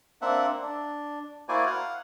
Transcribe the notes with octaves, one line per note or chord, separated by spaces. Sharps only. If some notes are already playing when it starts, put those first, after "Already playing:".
A#3 C4 D4 E5 F#5
D4
A#3 E4 F#4 C5 D5 G#5
F5 F#5